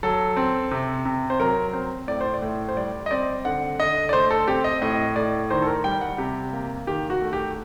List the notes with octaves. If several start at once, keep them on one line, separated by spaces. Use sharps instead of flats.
F#3 A4
C4
C3
C3
C5
F#3 A#4
C4 C5
A2 D5
C5
D5
A2
C5
G3 D5
D#5
C4 D5
D3 F#5
D3 D#5
D5
A3 C5
A4
C4 G4
D#5
A2 D#5
A2 D5
D#3 C5
A4
A#4
G3 G5
F#5
C3 G4
A#3
D#3 G4
F#4
A3
G4